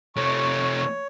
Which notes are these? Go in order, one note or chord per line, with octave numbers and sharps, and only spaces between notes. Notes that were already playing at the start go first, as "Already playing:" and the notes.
C3 A3 C#5 C#6